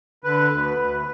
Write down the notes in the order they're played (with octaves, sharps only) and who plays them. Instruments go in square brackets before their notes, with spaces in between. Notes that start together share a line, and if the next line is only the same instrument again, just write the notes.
[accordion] D3 B4
D2
D2